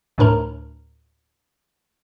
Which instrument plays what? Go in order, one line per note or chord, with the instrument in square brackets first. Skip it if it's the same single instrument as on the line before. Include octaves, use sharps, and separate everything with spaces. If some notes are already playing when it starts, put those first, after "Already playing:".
[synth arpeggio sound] D2 A2 D4 A#4 A#5